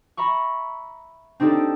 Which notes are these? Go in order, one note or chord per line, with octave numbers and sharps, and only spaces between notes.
E5 A#5 B5 C#6
C4 D4 D#4 G4 A4 D5